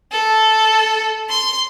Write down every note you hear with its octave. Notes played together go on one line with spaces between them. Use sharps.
A4
C6